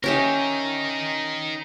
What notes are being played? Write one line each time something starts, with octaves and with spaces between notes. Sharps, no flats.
C#4 D#4 G4 A#4 E5